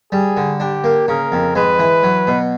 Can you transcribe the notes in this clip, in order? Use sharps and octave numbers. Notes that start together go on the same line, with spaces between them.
G3 G#4
D3
D4 G4
A#3
C#3 A#4
F2
G#3 B4
E3
F#3
B2